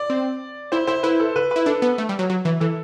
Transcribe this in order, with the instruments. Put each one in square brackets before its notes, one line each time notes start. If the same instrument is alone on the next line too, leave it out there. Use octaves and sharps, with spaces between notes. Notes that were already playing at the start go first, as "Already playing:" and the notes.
Already playing: [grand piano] D5
[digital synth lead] C4
[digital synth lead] E4 [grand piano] C5
[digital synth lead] E4 [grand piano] C5
[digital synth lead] E4 [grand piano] B4
[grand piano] A4
B4
[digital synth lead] E4 [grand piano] B4
[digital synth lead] D4 [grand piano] A4
[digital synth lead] B3
A3
G3
F#3
F#3
E3
[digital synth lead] E3 [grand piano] A4